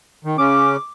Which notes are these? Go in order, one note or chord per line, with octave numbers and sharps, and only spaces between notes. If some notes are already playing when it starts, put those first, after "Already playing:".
D#3
C#3 C#4 D6